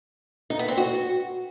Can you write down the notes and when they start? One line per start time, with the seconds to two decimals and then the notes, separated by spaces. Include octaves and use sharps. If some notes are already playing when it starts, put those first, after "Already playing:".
0.50 D#4
0.59 B3
0.68 C4
0.77 F#4